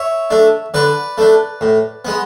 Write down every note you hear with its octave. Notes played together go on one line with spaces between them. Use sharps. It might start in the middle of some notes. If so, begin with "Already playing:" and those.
Already playing: C#5 E5
A3 D4
D3 B4 D5
A3 D4
A2
G#3 B3